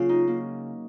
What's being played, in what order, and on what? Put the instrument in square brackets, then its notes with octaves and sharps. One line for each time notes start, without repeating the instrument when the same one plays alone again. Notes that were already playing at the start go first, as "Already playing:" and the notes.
Already playing: [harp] C#3 F#3 A#3 C#4 [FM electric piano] F4
[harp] D#4
A#3